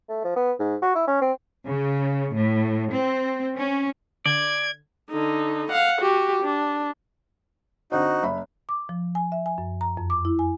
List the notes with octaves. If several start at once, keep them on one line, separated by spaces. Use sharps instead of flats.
A3
F3
B3
G#2
F#4
E4
C#4
C4
C#3
A2
C4
C#4
D3 D5 G#6
D3 D#4
F5 F#5
F#4 G4
D4
D3 C4 D#4 F#4
F#1 E5 B5
D6
F3
G#5
E5
G#5
F#2
A#5
F2
D6
E4
G#5